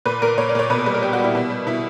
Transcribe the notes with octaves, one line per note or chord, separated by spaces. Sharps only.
A#2 B4
A#2 A#4
A#2 C#5
D5
A#2 C#5
B2 B4
A#4
G3 B4
A#4
G3 G4
F#4
G3
E4
B2
G3
B2 E4